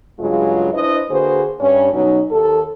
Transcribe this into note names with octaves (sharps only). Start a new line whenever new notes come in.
G2 C#3 F#3 G#3 F4
D4 E4 B4 C5 D#5
D3 A#3 F#4 G#4 B4 C5
G2 C#4
B2 F#3 C#4 D#4
D#2 A4